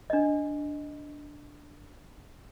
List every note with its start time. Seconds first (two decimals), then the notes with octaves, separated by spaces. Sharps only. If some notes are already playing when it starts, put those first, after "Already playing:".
0.10 D4 D#5